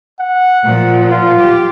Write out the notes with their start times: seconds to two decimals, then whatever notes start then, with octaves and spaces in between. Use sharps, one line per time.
0.20 F#5
0.64 A#2 F3
1.11 F4
1.40 G4